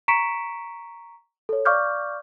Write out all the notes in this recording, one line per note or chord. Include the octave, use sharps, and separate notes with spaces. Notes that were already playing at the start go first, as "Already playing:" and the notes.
A#5 C#6 B6 C#7 D7 E7
A4 C#5
D5 F5 C#6 D6 F6 G6